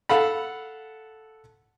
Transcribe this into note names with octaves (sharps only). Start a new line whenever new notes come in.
A4 F5 F#5 B5